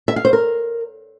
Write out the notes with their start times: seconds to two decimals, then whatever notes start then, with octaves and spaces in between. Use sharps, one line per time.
0.08 E5
0.16 F5
0.25 C5
0.33 A#4